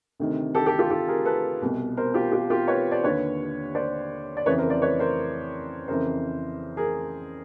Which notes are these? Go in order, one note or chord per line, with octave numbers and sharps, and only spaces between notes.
D2 C3 D#3
G4 A4
G4 A4
F4 G4
G4 A4
G#4 A#4
A4 B4
C2 B2
A#4 C5
F4 G4
F4 G4
F4 G4
B4 C#5
C5 D5
D#2 D3 B4 C#5
C5 D5
D5
F2 C#3 E3 B4 C#5
A#4 C5
C5 D5
B4 C#5
A#4 C5
F2 C#3 E3 A#4 C5
G#4 A#4